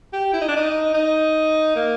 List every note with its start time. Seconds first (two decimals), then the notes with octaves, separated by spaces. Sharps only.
0.13 G4
0.33 E4
0.41 D#4
0.48 D4
0.56 D#4
0.94 D#4
1.76 A#3